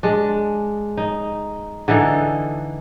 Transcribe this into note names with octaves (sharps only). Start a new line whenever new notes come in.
G#3 D4
D#4
D3 E3 D#4 A4